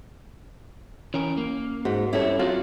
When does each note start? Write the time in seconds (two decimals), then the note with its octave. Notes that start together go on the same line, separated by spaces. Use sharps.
1.14 E3 C#4 A#4
1.37 A#3
1.85 G#2 F#4
2.13 G2 C4 C#4 E4 G4 A4 C#5 E5
2.39 F#3 C4 F4 F#4 A4